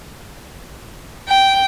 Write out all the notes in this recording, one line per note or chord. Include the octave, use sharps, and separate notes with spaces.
G5